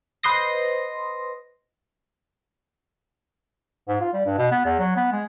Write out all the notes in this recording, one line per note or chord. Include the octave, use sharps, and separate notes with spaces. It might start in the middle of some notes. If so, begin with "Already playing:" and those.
B4 C5 D#5 C6 D#6 A#6
G#2
F4
G3
G2
B2
B3
E2
F#3
B3
G#3